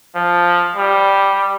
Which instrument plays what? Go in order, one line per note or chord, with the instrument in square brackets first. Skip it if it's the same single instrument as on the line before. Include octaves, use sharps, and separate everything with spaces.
[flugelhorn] F3
G3